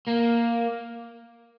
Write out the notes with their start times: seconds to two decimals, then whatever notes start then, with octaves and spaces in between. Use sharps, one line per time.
0.08 A#3